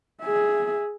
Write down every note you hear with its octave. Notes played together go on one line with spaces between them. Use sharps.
G#4 E5